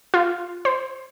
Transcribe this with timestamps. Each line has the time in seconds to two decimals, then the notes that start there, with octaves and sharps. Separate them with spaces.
0.14 F4
0.65 C5